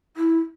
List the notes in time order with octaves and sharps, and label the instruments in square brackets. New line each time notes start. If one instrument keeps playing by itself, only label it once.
[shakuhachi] E4